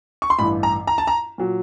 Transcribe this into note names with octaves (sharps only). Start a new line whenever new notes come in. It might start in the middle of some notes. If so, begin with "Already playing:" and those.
C#6
C6
A1 G2 E3 B5
A#5
A#5
A5
A#5
A#2 F#3